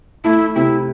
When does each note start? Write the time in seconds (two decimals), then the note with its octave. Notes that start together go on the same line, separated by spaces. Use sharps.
0.24 A3 E4
0.55 C3 E4